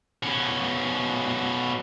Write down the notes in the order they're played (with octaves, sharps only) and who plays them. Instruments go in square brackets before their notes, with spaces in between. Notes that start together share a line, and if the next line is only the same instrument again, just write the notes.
[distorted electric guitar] B2 C#4